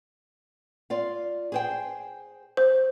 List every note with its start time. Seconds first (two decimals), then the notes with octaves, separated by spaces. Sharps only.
0.90 F4 D5 F5
1.52 G#4 C5 G5
2.57 C5